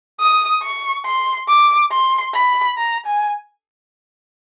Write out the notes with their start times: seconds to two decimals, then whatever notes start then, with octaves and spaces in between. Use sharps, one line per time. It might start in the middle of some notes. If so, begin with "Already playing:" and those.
0.20 D#6
0.62 C#6
1.06 C6
1.49 D6
1.92 C6
2.34 B5
2.78 A#5
3.06 G#5